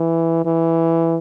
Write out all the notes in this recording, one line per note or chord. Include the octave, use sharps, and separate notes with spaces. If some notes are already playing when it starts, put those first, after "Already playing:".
Already playing: E3
E3